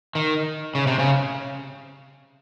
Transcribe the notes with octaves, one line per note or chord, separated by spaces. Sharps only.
D#3
C#3
C3
C#3